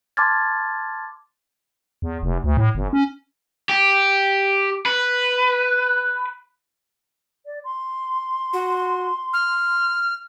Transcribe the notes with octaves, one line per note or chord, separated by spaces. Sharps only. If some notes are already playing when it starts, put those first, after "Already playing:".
A5 C6 D6 F6 G#6 A6
E2
F1
D2
A2
G1
C#4
G4
B4
D5
C6
F#4
F6